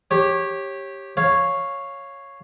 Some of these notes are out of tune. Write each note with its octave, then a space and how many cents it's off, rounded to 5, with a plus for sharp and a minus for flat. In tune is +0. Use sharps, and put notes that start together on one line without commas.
G4 +0 C#5 -20
C#5 -5 F5 +0